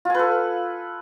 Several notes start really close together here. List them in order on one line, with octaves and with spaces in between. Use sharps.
F4 G#5 B4 A4